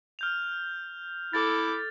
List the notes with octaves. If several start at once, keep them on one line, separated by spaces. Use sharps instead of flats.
F6 G6 F7
E4 A4 D6 A6